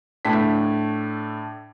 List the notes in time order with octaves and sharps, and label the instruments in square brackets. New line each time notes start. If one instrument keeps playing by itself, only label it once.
[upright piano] A2 A3 D4 B6